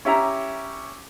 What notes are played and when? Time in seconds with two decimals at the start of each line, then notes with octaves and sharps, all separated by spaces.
0.05 C#4 E4 G4 E5 A#5